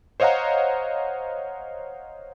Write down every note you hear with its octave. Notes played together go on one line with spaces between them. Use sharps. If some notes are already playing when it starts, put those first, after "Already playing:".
C5 C#5 D#5 F5 F#5 A#5